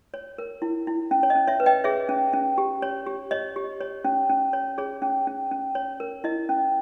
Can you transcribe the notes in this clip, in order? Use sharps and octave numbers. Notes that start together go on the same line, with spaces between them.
C#5
A#4
E4
E4
C#4
C#5
D#5
C#4
C#5 E5
B4
D#5 G5
G#4 C#5 E5
C#4
C#4
G4
C#5
G4
C#5 D#5
G4
C#5
C#4
C#4
C#5
G#4 C#5
C#4
C#4
C#4
C#5
A#4
E4 D#5
C#4